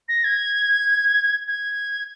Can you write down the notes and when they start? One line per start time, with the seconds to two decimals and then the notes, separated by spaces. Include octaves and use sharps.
0.08 A#6
0.24 G#6
1.47 G#6